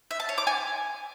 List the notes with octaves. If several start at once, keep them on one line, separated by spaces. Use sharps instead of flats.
E5
A5
C#5
D6
G#5